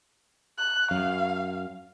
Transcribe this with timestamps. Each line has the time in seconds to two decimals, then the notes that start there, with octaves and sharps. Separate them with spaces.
0.58 F#6
0.91 F#2 F5